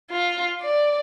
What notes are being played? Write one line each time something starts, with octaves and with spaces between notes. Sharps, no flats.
F4
D5